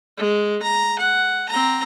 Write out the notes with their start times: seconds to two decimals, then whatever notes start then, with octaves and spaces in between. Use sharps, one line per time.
0.17 G#3
0.62 A#5
0.99 F#5
1.49 C4 A#5